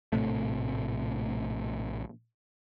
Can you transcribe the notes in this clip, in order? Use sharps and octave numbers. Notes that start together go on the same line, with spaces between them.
A#1 A2 C3 A3